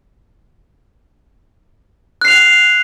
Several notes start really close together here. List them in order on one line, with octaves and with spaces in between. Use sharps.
F#6 C7 F7